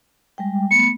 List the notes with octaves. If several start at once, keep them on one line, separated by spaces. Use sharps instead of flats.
G3 G#3 G5
A3 B3 B5 C#7